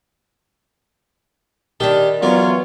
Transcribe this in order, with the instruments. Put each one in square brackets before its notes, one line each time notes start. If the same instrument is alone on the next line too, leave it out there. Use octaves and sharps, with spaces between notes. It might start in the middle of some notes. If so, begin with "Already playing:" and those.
[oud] D#3 G3 D4 [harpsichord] G4 A5
[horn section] E3 F4 C#5 [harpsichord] F#3 A#4 D5 [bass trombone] B3